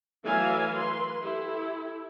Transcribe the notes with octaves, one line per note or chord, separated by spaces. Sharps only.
E3 F#3 A3 E5 F5 G#5
B4 C6
E4 G4 A4